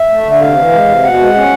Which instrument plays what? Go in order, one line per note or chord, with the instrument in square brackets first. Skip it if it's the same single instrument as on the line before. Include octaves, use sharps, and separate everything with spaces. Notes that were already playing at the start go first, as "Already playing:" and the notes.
Already playing: [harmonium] E5
A3
D3
E5
C3 F5
E3
G#3
C3
B2 F#5
G#3
C#4